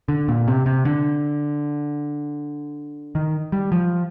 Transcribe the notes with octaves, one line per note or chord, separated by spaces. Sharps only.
D3
A#2
C3
C3
D3
D#3
G3
F3